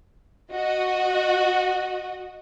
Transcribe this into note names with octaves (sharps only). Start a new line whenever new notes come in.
F#4 D#5